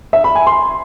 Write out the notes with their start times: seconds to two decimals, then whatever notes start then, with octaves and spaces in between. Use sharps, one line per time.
0.13 E5
0.24 B5
0.35 G#5
0.47 C6